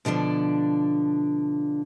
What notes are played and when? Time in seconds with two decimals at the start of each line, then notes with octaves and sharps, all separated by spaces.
0.05 B2 D3 F3 D4